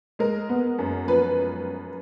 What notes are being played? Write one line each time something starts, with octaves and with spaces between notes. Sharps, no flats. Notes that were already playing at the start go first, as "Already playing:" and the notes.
G#3 A#4
B3
F#2
F3 B4